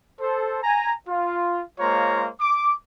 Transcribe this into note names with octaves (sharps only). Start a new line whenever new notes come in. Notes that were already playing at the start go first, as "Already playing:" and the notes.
A4 C5
G#5 A#5
F4
G#3 A#3 F4 C5 C#5 A#5
D6